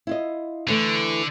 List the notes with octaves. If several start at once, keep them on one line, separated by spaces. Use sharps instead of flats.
E4 F4 D#5
D3 E3 A3